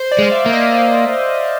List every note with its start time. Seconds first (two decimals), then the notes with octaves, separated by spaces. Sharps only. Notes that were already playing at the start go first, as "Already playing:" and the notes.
Already playing: C5
0.11 D5
0.19 G#3
0.22 F5
0.32 E5
0.46 A#3
0.53 D#5